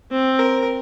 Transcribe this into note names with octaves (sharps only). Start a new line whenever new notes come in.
C4
A#4